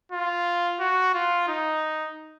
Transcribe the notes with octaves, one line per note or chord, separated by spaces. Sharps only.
F4
F#4
F4
D#4